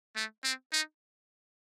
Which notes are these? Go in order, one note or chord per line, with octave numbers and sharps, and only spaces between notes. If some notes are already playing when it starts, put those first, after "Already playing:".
A3
C4
D#4